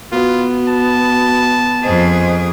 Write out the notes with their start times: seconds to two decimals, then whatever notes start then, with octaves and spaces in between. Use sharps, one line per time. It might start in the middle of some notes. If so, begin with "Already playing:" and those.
0.12 B3 F4 F#4
0.68 A5
1.83 F2 G#4 C5 D#5 G#5